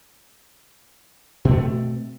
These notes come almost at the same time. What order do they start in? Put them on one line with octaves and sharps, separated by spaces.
B2 C4 A3